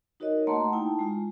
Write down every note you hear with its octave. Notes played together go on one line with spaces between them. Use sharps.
D#4 F#4 A#4 C#5 D#5
A3 A#3 F#5 A5 A#5 C6
D#4 E4 G5 A5
G#3 F4